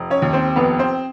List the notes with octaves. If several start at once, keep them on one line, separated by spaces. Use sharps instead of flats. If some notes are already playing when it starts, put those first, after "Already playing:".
Already playing: F1
C#4 C#5
D#2
C4 C5
F1 B3 B4
C4 C5